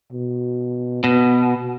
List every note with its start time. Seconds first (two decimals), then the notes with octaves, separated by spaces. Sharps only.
0.12 B2
1.04 B2 B3